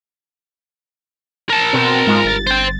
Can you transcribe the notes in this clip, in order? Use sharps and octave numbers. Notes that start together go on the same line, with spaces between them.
A#4 A5
B2 C4
G#2 G#3 F4
G1 A6
C5 G5